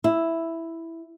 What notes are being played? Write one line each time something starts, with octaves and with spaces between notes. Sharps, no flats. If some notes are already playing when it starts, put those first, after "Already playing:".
E4